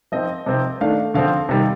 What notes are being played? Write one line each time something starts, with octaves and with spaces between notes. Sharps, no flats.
F3 C4 D#4 D#5
C3 F3 C4 D#4
D#3 A3 D4 F5
D3 F3 C4 F5
C3 D#3 G3